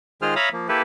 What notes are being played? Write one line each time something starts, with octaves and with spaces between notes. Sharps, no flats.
D#3 G#3 F4 G#4 C5 F6
C#5 E5 F5 A#5 B5 D#6
F3 A#3
A#3 E4 G4 A4 B4